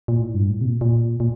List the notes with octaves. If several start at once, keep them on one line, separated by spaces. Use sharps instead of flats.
A#2
A2
G2
A2
C3
A#2
A#2
A#2